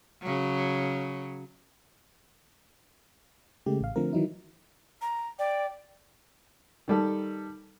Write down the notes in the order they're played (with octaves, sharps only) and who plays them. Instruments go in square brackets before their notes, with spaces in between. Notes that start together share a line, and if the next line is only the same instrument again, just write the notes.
[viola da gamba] C#3 F#3
[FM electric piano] C#3 G#3 A3 G4
A1 F5
D3 F3 A3 C4 A#4
D#3 E3 F#3 D#4 E4
[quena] A#5
[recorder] D5 [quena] G5
[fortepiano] D#3 G3 A4